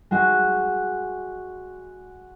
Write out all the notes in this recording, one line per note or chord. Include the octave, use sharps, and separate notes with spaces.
G#3 F#4